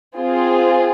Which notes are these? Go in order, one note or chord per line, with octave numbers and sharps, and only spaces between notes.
C4 F4 G#4